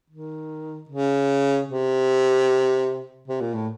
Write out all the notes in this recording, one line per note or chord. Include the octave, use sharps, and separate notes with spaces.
D#3
C#3
C3
C3
A#2
A2